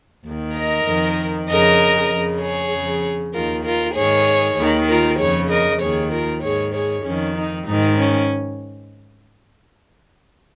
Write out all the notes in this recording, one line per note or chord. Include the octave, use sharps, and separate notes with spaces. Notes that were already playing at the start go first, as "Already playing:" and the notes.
D#2 D#3
A#4 D#5
F2 D#3
F2 C#3 A#4 D#5
F2 C#3
G#4 C#5
F2 C#3
D#2 D#3 F4 A#4
F4 A#4
G#2 D#3 G#4 C#5
D#2 D#3
F4 A#4
F2 C#3 G#4 C#5
A#4 D#5
D#2 D#3 G#4 C#5
F4 A#4
G#2 D#3 G#4 C#5
G#4 C#5
F2 D#3 C#4
D#4
G#2 D#3 D#4
C#4